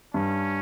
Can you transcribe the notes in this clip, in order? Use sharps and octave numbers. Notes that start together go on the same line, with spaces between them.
G2 C#4